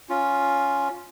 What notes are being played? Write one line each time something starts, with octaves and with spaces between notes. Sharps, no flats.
C#4 F4